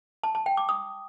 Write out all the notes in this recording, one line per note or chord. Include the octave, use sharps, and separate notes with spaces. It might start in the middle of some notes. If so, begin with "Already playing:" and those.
A5
A5
G5
D6
D#6